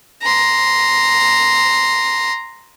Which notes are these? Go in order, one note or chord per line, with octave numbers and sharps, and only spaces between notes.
A#5 C6